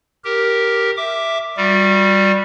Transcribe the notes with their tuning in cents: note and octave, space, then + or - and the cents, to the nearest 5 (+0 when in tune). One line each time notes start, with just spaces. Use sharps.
G4 +0 A#4 +0
E5 +0 D6 +0
G3 +0 F#4 -35